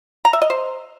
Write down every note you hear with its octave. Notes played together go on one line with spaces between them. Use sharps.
A#5
E5
D#5
C5